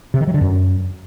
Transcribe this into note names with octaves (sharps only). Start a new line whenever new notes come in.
C3
D#3
F#3
D3
F#2